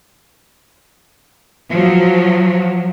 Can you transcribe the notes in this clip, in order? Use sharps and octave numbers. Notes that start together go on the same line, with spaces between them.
F3 F#3